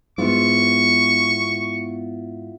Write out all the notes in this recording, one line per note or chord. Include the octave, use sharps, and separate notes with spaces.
G#2 B3 E4 F4 C#6